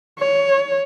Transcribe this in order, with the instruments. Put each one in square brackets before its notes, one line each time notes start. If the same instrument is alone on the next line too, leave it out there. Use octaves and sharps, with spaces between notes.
[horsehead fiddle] C#5